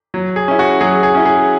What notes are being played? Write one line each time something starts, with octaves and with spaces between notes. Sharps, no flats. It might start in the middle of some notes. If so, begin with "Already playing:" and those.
F#3
G#4
C#4 E4
F#4
F#3 G#4
G#4
C#4 E4
G#4